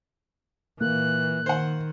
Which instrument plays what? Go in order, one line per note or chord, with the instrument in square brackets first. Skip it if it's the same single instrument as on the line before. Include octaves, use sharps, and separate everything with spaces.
[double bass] A#2 E3 [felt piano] A#3 [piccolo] F#6
[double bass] D#3 [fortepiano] C5 F#5